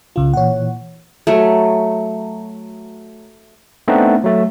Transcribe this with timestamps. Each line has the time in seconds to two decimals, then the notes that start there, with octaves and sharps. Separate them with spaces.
0.16 C2 C#3 F4
0.33 A#2 E3 C#5 F#5
1.27 F#3 A3
3.88 A3 B3 C4 D4 D#4
4.24 F#3 A3